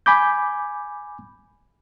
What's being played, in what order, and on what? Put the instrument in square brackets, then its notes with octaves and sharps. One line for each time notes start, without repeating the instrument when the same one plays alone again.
[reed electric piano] G#5 B5 D6 G6